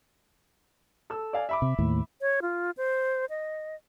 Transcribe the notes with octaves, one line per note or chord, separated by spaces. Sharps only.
A4 E6
D5 F5 G#5
E5 B5 D6
C3
D#2 A2
C#5
F4
C5
D#5